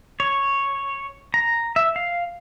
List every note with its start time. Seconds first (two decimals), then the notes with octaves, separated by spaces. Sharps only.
0.20 C#5
1.34 A#5
1.76 E5
1.96 F5